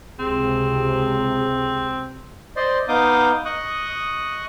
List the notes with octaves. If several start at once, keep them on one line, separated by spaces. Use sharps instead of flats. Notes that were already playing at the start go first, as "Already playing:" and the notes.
C#2 C3 C4 G#4
C5 D5 D#5 C6
B3 D#4 F5 D6 D#6 G6
D#5 C#6 D#6 F#6